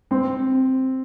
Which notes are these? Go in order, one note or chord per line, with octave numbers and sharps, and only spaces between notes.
C4